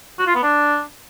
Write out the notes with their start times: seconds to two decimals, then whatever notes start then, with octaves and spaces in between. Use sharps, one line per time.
0.19 F#4
0.27 F4
0.35 B3
0.43 D4